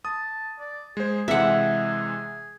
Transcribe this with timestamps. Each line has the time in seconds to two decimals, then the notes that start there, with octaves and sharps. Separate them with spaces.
0.05 A5 D#6
0.60 D5
0.97 G#3 G#4 C5
1.28 C3 E3 G#3 E5 F#5